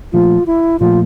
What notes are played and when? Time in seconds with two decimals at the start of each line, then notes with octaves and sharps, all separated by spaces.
0.13 A#2 F3 A3 F4
0.46 E4
0.80 A#2 F3 A3 F4